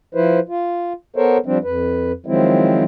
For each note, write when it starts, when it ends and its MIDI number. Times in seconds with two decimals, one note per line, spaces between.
0.15 0.40 53
0.15 0.40 64
0.15 0.40 71
0.15 0.40 72
0.49 0.93 65
1.16 1.38 59
1.16 1.38 69
1.16 1.38 70
1.16 1.38 72
1.16 1.38 73
1.46 1.58 53
1.46 1.58 55
1.46 1.58 60
1.46 1.58 62
1.64 2.12 41
1.64 2.12 71
2.26 2.84 51
2.26 2.84 53
2.26 2.84 54
2.26 2.84 56
2.26 2.84 60
2.26 2.84 64